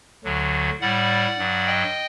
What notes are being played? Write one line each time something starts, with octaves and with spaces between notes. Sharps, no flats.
D2 D3 F#3
A2 G3 D5 F#5
G2 F#3
D#5 G5